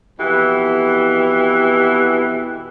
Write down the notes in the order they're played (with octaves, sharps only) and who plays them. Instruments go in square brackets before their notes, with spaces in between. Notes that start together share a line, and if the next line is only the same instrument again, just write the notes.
[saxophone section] F2 B2 E3 B3 G4